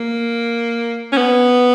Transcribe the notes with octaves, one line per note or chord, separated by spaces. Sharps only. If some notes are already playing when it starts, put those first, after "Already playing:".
Already playing: A#3
C#4
B3